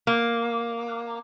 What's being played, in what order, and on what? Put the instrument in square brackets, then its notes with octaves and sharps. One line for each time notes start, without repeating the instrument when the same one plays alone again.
[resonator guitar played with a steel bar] A#3